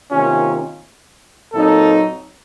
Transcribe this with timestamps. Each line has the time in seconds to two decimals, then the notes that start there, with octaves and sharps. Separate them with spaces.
0.11 C3 D#3 A#3 C#4 F4
1.53 A#2 F#3 C4 D#4 A4